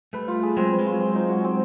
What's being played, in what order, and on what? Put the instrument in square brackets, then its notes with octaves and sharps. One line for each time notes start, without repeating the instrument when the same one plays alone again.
[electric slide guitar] G3 A3 [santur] B4
[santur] F4
G#4
[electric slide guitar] F#3 G#3 [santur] C4
[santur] B4
[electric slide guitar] F#3 G#3
[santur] F4
C4
D#4
F#4
C4